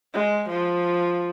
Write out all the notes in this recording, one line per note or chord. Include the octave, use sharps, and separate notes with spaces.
G#3
F3